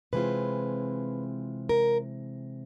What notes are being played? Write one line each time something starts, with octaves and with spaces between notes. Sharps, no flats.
C3 E3 G#3 C4 F4 B4
A#4